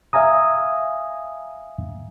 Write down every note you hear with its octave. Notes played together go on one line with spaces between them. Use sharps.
E5 F5 G#5 A#5 D#6